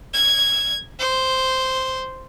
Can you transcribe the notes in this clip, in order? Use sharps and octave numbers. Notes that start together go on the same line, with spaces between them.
G#6
C5